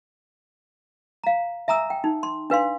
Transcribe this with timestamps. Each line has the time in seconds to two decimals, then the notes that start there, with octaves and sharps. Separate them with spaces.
1.24 F5 A#5
1.68 E5 G#5 A#5 D#6 E6
1.90 G5
2.04 D#4
2.23 C6
2.50 D4 B4 F5 C6